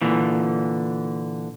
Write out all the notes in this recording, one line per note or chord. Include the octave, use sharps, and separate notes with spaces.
A#2 D3 E3